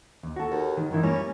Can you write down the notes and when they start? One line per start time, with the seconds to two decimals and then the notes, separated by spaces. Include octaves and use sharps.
0.23 D#2
0.36 F#4 A4
0.51 D#2
0.77 D#3
0.91 F#2 D#3 E3 E4
1.03 G3 A#3 C#4